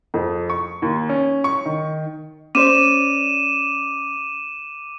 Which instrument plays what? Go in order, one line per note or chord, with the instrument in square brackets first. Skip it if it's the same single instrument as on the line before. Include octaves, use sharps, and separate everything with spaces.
[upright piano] F2
C#6
D#2
C#4
C#6
D#3
[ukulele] C#4 C5 D5 [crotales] D6 D#7 E7